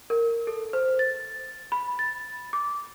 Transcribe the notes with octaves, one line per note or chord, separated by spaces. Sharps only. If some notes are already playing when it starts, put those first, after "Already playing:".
A#4
A4
C5
A6
B5
A6
D6